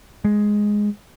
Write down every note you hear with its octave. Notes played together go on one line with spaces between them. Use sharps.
G#3